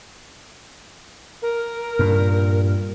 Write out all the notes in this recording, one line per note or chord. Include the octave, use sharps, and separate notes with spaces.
A#4
G2 A#2